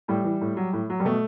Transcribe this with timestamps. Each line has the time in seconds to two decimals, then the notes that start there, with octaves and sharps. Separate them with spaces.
0.08 A2 G3
0.25 E3
0.41 A2
0.57 F#3
0.73 A2
0.90 F#3
1.00 G3
1.05 B2 A3